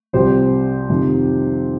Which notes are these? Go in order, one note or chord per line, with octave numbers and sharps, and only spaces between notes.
C2 C3 F3 G4 C5
F2 C3 D#3